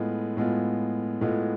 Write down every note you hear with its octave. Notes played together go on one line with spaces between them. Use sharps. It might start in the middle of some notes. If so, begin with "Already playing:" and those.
Already playing: A2 G#3 B3 F4
A2 G#3 B3 F4
A2 G#3 B3 F4